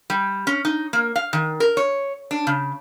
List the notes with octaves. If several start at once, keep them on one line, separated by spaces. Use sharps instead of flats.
G3
C#4
D#4
A#3
F5
D#3
A#4
C#5
D4
C#3